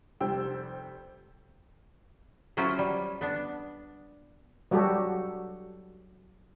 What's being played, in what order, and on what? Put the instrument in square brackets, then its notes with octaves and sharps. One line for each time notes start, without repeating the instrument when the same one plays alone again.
[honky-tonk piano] F1 G3 C5 G5 E6
[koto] F#3 C#4 E4 F4 C5
G3
B3 D4
[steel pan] F#3 G3 F#4 G4 A4